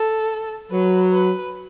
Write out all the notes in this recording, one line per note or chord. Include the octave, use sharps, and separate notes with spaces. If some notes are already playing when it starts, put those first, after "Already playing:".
Already playing: A4
F#3 B4
B4